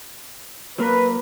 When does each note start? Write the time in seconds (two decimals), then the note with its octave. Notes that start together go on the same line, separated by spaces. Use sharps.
0.78 F#3 A#3 A#4 B4